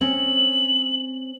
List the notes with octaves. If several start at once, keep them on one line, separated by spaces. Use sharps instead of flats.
C4 C#4 F#7